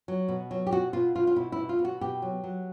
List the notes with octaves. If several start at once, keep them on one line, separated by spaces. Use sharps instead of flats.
F#3
B2
F#3
G4
B2 F#4
B2 F4
B2 F4
F4
B2 E4
E4
B2
F4
B2
F#4
B2 G4
F#3
F#3